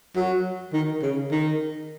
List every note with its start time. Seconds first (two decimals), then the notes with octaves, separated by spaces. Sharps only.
0.16 F#3
0.73 D#3
1.02 C#3
1.31 D#3